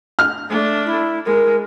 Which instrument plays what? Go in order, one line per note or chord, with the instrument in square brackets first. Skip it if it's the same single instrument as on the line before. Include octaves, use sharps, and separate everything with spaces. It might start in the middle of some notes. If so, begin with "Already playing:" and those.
[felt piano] F6
[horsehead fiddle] A3 D4
[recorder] E4
[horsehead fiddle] G#3 [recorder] A#4